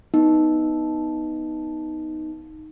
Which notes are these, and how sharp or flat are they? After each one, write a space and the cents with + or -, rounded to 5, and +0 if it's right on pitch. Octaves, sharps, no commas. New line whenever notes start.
B3 +0 D#4 +0